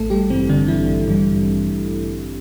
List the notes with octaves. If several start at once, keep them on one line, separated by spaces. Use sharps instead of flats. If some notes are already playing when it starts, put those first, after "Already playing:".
Already playing: A1 A3 A4
G3 G4
G2 E3 G3 C4
D3 D4
A1 E3 E4
G2 E3 G3